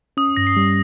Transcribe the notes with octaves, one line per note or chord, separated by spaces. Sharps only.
C#4 D#6
G2 A#6
C7
G3